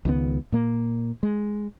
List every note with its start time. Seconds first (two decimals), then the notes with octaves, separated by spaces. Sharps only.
0.05 C#2 D#3 F#3 B3
0.52 A#2 A#3
1.23 G#3